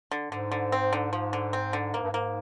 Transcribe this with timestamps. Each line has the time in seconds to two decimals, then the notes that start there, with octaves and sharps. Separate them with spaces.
0.11 D3
0.32 G#2 D3
0.51 D3
0.72 C4
0.93 D3
1.13 F3
1.33 D3
1.53 C4
1.73 D3
1.94 G#2 A#3
2.02 G2
2.10 G#2 A#3